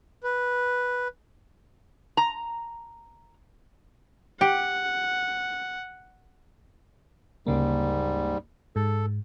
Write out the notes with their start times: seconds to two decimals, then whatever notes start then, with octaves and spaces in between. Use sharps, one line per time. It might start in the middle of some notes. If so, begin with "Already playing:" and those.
0.24 B4
2.17 A#5
4.41 G4 F#5
7.47 D2 G#2 C#3 G3 A#3
8.76 G#2 A4